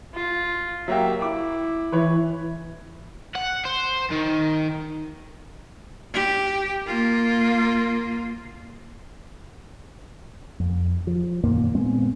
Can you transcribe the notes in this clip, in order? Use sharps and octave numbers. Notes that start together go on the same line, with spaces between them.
F4
F#3 A#3 G4 E5
E4 D6
E3 B4 C#5
F#5
C5
D#3
G4
A#3 F4
F2
F3
F#2 A#2 D#3 A#3
A#2 G#3 B3 C4